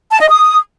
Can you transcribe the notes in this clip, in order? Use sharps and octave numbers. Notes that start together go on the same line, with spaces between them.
A5
D#5
D#6